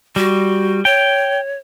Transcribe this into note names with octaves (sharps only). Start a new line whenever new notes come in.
G3 F#4
C#5 G5